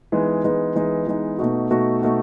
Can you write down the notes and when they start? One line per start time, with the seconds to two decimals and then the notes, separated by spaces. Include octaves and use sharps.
0.12 E3 G#3 B3 D#4
0.44 E3 G#3 B3 D#4
0.76 E3 G#3 B3 D#4
1.07 E3 G#3 B3 D#4
1.39 B2 A3 D#4 F#4
1.71 B2 A3 D#4 F#4
2.02 B2 A3 D#4 F#4